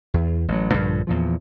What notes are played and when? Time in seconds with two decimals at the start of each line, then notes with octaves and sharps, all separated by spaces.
0.14 E2
0.48 A1 F#3
0.74 A#1 G2 D3
1.07 E2 A#2 F3